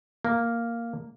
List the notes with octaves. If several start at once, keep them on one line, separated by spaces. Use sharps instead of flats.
A#3